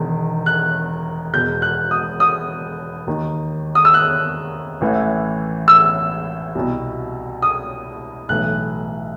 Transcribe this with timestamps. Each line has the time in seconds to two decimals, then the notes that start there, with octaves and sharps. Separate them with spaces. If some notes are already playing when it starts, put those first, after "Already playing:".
Already playing: E1 E2 D#3
0.46 F#6
1.33 E1 E2 B2 G6
1.62 F#6
1.91 D#6
2.20 D#6
3.07 D#2 D#3
3.75 D#6
3.85 E6
3.94 F#6
4.81 A1 A2 E3
5.68 E6
6.55 C2 B2
7.42 D#6
8.29 B1 A2 E3 F#6